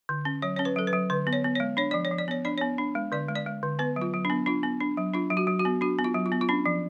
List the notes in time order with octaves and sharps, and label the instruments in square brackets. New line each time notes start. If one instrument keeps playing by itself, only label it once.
[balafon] D3
C#4
F#3 C#5
C#4 C#5
B4
F#3 A4
B4
F#3
D3 B4
B3
C#5
B3
G#3 C#5
D4 C#5
F3 D5
C#5
F3
D5
B3 C#5
D4 D5
B3 C#5
D4
G#3
D3 D5
G#3
D5
G#3
D3
B3 B4
F#3
F4
F#3
D4
B3
D4 F4
B3
D4
F#3
D4 F4
F#3
F#4
F#3
F#4
B3
D4 F#4
B3
F4
F#3
F4
B3
F4
C#4 D4
F3